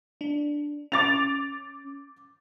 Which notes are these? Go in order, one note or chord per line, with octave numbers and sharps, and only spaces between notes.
D4
C#4 D6 A6 F7